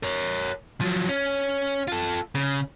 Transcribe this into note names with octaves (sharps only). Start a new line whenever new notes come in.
A#4 C#5
F3 F#3
C#4
F4 A4
C#3